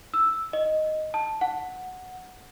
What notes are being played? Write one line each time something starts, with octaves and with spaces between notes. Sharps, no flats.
E6
D#5
A5
F#5